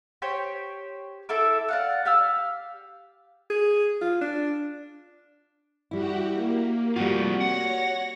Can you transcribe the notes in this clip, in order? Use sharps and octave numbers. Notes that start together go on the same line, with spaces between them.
G4 C5 C#5 G5
E4 A4 E5 D6
D5 F5 F#5
G4 F5 E6
G#4
F4
D4
G3 E4 F#4 G4 F#5
A#3
G3 A3 C4 F4 F#4
C#5 F#5 A#6